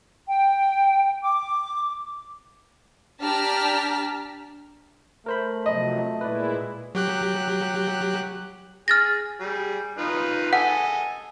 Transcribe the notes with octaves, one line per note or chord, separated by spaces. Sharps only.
G5
D6
D4 G4 A5 A#5 F6 B6
A3 A#4 C5 B5
C3 F3 F#3 D#5 B5
A#2 G#3 E4 B4 D5
F#3 G4 F#6
G#4 F6 A6 A#6
G3 G#4
D#4 F4 B4
A4 D#5 F#5 G#5